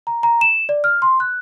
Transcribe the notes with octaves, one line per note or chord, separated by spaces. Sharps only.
A#5
A#5
E7
D5
F6
C6
F#6